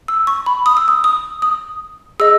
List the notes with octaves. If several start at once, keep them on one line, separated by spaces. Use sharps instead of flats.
E6
C#6
B5
D#6
E6
D#6
D#6
D#6
G#4 D#5 E6